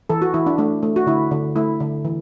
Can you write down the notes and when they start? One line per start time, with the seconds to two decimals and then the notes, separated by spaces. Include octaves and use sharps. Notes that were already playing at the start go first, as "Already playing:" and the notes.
0.09 E3 A4
0.22 F#4
0.34 E3 E4
0.47 D4
0.58 A3 D4
0.83 A3
0.96 F#4
1.07 D3 E4
1.31 D3
1.56 A3 E4
1.80 D3
2.05 E3